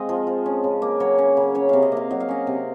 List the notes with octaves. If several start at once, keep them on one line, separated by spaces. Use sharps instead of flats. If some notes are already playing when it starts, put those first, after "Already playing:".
Already playing: G#3 C4 D#5 F5
F3
F3
C#4
C#3
A#3
F#3 C#5
C#4
C#3
C#4 C#5
C3 F5
D#5
A#3 F5
F#3 D#5
F5
C#4 D#5
C3